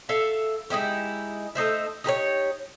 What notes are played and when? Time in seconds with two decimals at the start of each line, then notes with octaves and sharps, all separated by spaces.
0.09 A4 E5 F5
0.70 G#3 D#4 E4 G4
1.55 A3 D#4 C5 E5
2.04 D#4 G4 A#4 C#5